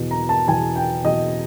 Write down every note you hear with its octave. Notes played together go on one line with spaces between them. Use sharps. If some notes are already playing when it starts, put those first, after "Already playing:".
Already playing: E2 B2
A#5
A5
E2 B2 G#5
G5
E2 B2 D#5